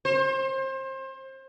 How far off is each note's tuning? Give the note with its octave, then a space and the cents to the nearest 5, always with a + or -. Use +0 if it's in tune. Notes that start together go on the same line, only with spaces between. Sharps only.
C5 +30